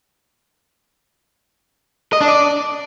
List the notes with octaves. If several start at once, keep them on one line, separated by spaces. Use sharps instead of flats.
D#5
D4
D5